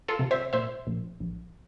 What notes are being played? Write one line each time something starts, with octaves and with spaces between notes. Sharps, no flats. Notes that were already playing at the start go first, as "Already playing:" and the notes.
F4 A4
C3
C5 E5
A#2 C5 E5
A#1
A#1